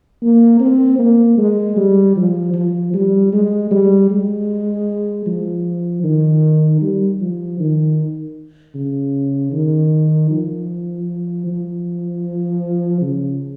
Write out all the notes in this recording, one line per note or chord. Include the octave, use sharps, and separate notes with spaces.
A#3
C4
A#3
G#3
G3
F3
F3
G3
G#3
G3
G#3
F3
D#3
G3
F3
D#3
C#3
D#3
F3
F3
C#3